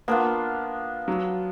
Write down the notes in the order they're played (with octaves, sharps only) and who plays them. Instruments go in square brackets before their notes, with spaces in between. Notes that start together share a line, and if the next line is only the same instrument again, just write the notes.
[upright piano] A#3 [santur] B3 D4 F4
[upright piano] F#3